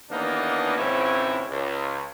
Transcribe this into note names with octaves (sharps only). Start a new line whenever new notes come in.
D#2 E3 A#3 B3 D4 D#4
G#1 C#2 G#2 C4 C#4 E4
C#2